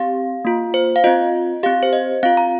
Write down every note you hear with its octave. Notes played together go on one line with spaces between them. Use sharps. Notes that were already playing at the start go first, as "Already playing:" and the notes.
Already playing: C4 G4 F5
A#3 F4
C5
F5
C4 F4 D#5
C4 G4 F5
C5
D#5
C4 F4 F5
A#5